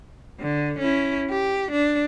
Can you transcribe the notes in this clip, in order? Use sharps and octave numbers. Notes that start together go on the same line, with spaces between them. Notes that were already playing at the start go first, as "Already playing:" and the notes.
D3
C#4 E4
G4
D4